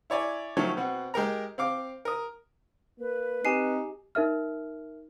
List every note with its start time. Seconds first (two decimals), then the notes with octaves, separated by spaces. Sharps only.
0.10 E4 C#5 D5 G#5
0.57 D#3 F3 F#3 A3 C#4
0.77 B2 C4 F#5
1.14 G#3 G4 A#4 A#5
1.58 C4 F5 D6
2.05 A#4 D#6
3.00 A#3 B4
3.45 C4 D#4 G4 G#5 C7
4.15 D#4 A#4 E5 F6